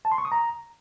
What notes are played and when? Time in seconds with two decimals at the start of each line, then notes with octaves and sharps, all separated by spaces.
0.05 A5
0.12 C6
0.18 C#6
0.25 D#6
0.32 A#5